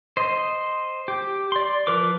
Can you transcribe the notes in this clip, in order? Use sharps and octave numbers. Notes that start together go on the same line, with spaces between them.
C5 D#5
G4
D5 C6
F3 A#4 B4 D6